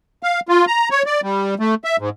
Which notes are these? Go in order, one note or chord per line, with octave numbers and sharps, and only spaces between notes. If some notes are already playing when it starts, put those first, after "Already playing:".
F5
F4
A#5
C#5
D5
G3
A3
E5
G#2